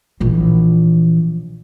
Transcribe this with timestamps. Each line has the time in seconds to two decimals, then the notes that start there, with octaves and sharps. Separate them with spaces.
0.20 A#1 E3